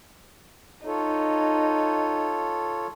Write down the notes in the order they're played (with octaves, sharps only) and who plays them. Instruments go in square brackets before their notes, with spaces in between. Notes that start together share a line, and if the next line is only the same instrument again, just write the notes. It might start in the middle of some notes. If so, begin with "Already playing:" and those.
[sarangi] D#4 [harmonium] F4 A4 C#5